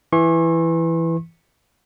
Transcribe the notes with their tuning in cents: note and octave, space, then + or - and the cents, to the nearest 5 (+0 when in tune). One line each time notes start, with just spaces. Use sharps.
E3 +5 C#6 -45